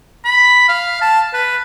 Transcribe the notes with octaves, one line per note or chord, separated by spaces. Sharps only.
B5
F5
A5
B4